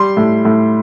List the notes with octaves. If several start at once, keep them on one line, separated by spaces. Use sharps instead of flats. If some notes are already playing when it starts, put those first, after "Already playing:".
Already playing: G3 C6
A2
A2